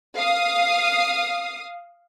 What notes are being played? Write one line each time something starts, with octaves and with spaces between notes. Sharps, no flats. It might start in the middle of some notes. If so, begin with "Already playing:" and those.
F5 D#6